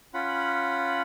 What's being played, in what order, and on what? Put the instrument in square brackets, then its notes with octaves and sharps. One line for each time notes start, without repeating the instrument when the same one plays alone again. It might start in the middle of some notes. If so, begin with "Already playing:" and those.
[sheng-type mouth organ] C#4 F4 F#5 B5